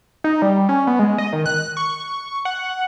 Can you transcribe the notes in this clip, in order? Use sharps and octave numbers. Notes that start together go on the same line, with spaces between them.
D#4
G3
C#4
B3
G#3
D#5
D#3
F#6
C#6
F#5